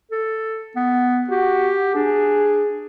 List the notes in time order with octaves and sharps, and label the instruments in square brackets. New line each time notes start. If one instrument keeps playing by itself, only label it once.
[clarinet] A4
B3
[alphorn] F#4 [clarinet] G4
[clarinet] D4 [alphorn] G#4